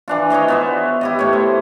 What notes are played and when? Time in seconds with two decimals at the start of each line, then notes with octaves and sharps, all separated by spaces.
0.08 E3 D4 F4
0.30 D#4 C#5 D#5 F5
0.48 B3 F4 E5
1.01 E4 G4 D#5
1.19 A2 C#5
1.33 C5